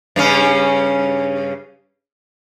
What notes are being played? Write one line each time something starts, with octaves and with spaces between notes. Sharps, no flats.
G2 C#3 C#4